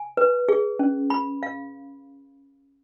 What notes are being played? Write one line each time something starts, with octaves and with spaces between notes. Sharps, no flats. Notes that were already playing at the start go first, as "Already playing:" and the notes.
Already playing: G#5
B4
G#4
C#4
B5
F5